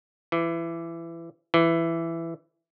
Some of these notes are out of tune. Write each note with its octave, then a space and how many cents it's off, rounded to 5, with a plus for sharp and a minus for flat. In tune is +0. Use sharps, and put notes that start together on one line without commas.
E3 +20
E3 +10